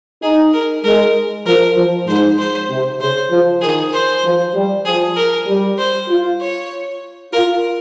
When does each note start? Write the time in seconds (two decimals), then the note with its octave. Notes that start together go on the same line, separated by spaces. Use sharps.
0.22 D#4 G#4
0.53 A#4
0.84 G#3 A#4
1.46 F3 A#4
1.77 F3
2.07 G#2 C5
2.38 C5
2.70 C3
3.00 C#3 C5
3.31 F3
3.61 D#3 G#4
3.93 C5
4.24 F3
4.55 G3
4.85 F3 G#4
5.16 A#4
5.47 G3
5.78 C5
6.09 F4
6.41 C#5
7.33 F4 A#4